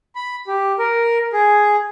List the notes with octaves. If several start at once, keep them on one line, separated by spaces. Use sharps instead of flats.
B5
G4
A#4
G#4